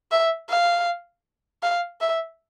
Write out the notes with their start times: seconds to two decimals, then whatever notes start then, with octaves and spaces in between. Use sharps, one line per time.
0.11 E5
0.49 F5
1.63 F5
2.01 E5